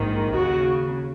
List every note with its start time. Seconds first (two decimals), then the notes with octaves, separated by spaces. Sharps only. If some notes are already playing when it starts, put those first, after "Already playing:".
Already playing: A#1 G#2 D#3
0.34 D#2 C#3 F#4